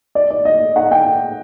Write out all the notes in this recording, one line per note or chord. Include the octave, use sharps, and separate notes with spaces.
D5
D5
D#5
F#5
G5